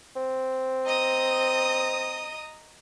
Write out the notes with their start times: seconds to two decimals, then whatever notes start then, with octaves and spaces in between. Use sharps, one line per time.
0.16 C4
0.85 D#5 A#5 D#6